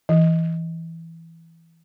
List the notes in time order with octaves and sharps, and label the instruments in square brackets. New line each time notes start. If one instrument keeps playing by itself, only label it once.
[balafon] E3